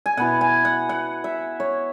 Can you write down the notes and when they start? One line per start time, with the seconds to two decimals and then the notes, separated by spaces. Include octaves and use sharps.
0.06 G#5
0.17 B2 B3 E4 F#5
0.41 G#5
0.65 F#5
0.89 F#5
1.24 E5
1.60 C#5